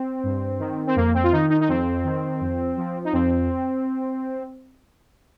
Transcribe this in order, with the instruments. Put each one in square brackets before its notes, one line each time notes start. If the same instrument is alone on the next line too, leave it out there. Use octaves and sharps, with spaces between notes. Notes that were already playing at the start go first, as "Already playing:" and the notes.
Already playing: [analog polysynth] C4
G2
D#3
C4
F2 A#3
C4
F4
D#3 D#4
D#4
D#4
F2 C4
D#3
F2
F3
D#4
F2 C4